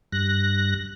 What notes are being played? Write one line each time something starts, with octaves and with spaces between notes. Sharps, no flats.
G2 F#6 A#6